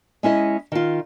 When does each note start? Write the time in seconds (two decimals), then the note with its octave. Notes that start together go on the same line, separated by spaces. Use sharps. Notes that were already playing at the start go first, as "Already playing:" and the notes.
0.23 G#3 C#4 E4 D#5
0.72 D#3 F4